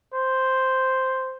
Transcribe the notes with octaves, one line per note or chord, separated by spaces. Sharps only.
C5